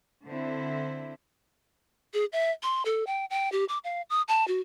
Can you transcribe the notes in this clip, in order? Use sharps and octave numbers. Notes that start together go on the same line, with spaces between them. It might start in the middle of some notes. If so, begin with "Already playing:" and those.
D3 C4 E4
G#4
E5
C6
A4
G5
G5
G4
D6
F5
D#6
A5
F#4